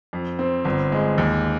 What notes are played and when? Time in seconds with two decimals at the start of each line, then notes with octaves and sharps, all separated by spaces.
0.13 F2
0.39 C4
0.65 G1
0.92 G#3
1.18 D#2